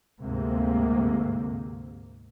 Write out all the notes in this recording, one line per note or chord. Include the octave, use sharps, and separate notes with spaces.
D2 G#2 C3 A#3